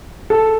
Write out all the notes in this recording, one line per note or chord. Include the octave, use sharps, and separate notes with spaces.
A4